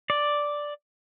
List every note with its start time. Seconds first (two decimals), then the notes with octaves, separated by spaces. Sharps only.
0.10 D5